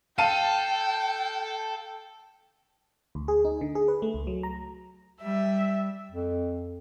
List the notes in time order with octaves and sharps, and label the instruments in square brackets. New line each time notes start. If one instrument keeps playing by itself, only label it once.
[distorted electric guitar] A4 [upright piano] F5 A5 D#7 [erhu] G5
[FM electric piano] D2
G#4
D#4
D3
G#4
B4
A3
C#2
F#3
A#5
[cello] G3 [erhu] E5
[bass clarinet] F2